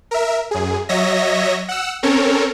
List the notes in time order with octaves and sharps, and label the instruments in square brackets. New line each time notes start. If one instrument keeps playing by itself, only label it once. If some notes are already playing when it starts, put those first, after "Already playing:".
[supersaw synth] A#4 E5
F#2 G#4
F#3 C#5 D#5 E5 A#6
F#5 E6
C4 C#4 A4 A#4 C#5